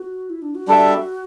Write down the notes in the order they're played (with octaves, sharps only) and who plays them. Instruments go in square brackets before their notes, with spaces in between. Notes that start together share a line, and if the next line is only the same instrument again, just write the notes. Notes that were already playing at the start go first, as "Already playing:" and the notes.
Already playing: [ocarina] F#4
E4
D4
F#4
[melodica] G3 D4 A4 E5